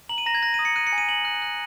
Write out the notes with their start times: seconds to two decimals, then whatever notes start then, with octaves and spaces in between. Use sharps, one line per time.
0.09 A#5 F#7
0.18 D#7
0.26 A#5 A#6
0.35 G#6
0.42 F#6 A#6
0.54 D#6 D#7
0.65 C#7
0.76 F#6 D#7
0.87 C#7
0.93 G#5
0.98 D#7
1.09 G#5 F#7
1.25 F#6
1.42 F#6